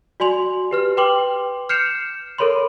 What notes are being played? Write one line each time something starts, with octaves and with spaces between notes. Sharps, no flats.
F#4 D5 G#5 C6 F7
G4 B4 F6
B4 G5 C6 D6 F#7
F6 G6 C7 C#7 E7 F7
A4 A#4 C#5 B5 C6